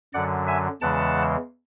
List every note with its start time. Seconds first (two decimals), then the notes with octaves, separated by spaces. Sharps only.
0.14 F#2 D3 F#3 D5 F#5
0.47 E5 G#5
0.81 E2 C#3 E3 G#3 F#5 A5